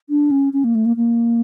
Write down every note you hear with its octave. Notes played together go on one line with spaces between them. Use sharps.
D4
C#4
C#4
A#3
A3
A#3
A#3